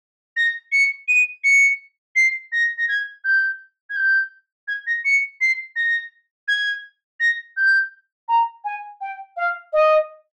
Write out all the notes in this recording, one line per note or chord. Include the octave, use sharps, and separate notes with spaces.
A#6
C#7
D#7
C#7
C7
A#6
A#6
G#6
G6
G#6
G6
G#6
A#6
C#7
C7
A#6
G#6
A#6
G6
A#5
G#5
G5
F5
D#5